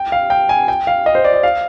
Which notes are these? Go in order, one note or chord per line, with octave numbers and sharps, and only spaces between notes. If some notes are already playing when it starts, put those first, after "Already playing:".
Already playing: G5
F5
G5
G#5
G5
F5
D#5
C5
D5
D#5
F5